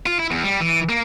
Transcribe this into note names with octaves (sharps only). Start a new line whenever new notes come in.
F4
E4
E2
G3
E3
A#3